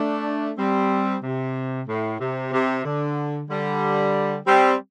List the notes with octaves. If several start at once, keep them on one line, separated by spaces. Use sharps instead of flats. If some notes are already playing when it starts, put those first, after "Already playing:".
Already playing: A3 D4
G3 C4
C3
A2
C3
C3
D3
D3 G3
G3 C4